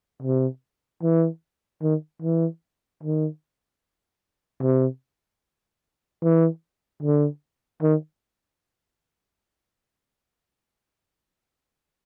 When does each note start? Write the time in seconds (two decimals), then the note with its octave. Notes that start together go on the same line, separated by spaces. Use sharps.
0.22 C3
1.03 E3
1.82 D#3
2.22 E3
3.03 D#3
4.62 C3
6.23 E3
7.03 D3
7.82 D#3